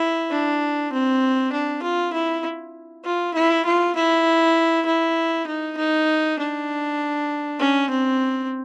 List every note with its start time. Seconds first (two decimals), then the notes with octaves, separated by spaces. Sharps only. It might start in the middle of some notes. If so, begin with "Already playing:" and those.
Already playing: E4
0.31 D4
0.92 C4
1.52 D4
1.83 F4
2.13 E4
3.05 F4
3.34 E4
3.65 F4
3.96 E4
4.86 E4
5.47 D#4
5.77 D#4
6.39 D4
7.59 C#4
7.90 C4